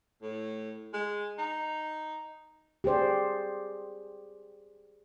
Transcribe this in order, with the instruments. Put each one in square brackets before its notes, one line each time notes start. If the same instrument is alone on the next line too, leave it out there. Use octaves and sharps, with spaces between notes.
[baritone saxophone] A2
G#3
D#4
[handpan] G4 G#4 C5 D5